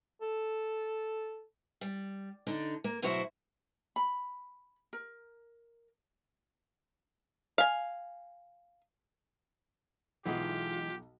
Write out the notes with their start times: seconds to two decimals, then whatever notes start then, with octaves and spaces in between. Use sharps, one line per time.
0.22 A4
1.81 G3
2.47 D3 D4 D#4
2.84 A#3
3.02 D2 B2 F#3 E4 F#4 C5
3.96 B5
4.93 A#4
7.58 F5 G#5
10.26 B1 E3 G#3 D#4 F4 G4 F#5